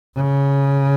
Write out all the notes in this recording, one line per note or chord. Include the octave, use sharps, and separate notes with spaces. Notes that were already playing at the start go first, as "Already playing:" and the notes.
C#3